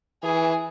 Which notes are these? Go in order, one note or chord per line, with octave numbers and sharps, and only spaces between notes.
E3 G#4